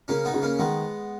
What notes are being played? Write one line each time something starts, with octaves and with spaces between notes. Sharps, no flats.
C#3 A#3 C#4
B3 D#4
C#3
A#3 C#4
D#3 G#3 B3